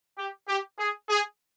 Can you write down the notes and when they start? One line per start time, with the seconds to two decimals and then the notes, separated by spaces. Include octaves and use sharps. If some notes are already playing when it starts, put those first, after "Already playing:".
0.18 G4
0.48 G4
0.79 G#4
1.10 G#4